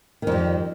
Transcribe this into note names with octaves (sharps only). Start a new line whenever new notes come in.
F2 D#3 G3